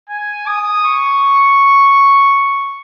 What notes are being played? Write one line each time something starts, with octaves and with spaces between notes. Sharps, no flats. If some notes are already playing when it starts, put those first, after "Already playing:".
G#5
D#6
C#6